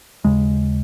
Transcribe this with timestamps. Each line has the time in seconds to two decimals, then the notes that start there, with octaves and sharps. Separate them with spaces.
0.24 D#2 C#3 G#3